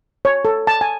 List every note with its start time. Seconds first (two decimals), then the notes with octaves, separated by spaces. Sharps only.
0.25 C#5
0.45 A4
0.67 A5
0.81 G#5